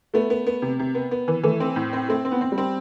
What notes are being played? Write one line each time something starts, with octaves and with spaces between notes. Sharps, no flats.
A3 B3
B3
B3
C3
C3
B3
B3
E3
E3 A3
C4
A2
C4
A3 C4
C4
B3
C4
G3
C4